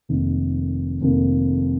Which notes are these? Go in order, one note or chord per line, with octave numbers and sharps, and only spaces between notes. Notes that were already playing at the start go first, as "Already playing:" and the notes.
F1 F2 D#3 A#3
F1 F2 D#3 A#3